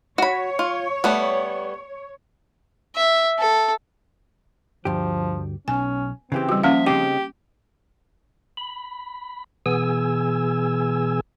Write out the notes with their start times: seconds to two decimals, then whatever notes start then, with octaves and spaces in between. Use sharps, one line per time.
0.18 F#4 C#5 B5
0.59 F4
1.04 G3 A3 B3
2.96 E5
3.39 A4
4.85 D2 G2 F3 G4
5.68 B1 C#4 G#5
6.32 C#3 E3 C4 G4
6.49 G3 F#4
6.63 F3 A#3 C#4 E5 F5
6.86 C#3 C4 D#4 G4 D6
8.57 B5
9.66 B2 E3 B3 G#4 G#5 E6